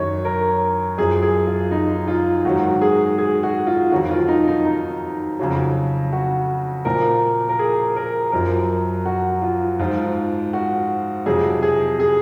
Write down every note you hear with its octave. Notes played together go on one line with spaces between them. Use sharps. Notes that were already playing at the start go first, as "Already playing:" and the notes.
Already playing: F#2 D#3 F#3 C#5
A#4
F#2 F3 G#4
G#4
F4
D#4
F4
G#2 D#3 F#3 F#4
G#4
G#4
F#4
F4
F2 D#3 F#3 F#4
F4
D#4
D#4
D#4
F2 C#3 F#3
F#4
A#2 F3 A#4
A#4
G#4
A#4
F#2 F3 A#4
F#4
F4
G#2 F3 F4
F#4
F2 C3 F#3 G#4
G#4
G#4